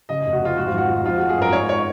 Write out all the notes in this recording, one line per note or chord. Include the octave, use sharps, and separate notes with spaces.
C#3 D#5
D#5
F1
F#4
F2 F4
G#2 F#4
F4
G#1 F#4
G#2
F3 F4
F#4
G#3
G#4
F#2 A#4
G#2 C#5
C#5